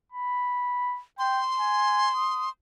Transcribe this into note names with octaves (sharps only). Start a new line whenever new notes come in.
B5
G5 C6
G#5
D#6